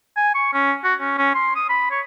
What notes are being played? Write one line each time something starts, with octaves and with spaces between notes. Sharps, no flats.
G#5
C#6
C#4
F#4
C#4
C#4
C6
D#6
B5
C#5